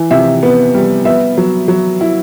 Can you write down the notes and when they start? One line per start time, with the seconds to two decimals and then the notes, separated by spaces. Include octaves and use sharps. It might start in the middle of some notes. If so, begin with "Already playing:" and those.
Already playing: E3
0.11 C3 E5
0.43 B3
0.74 G3
1.05 B3 E5
1.37 F#3
1.68 F#3
2.01 E4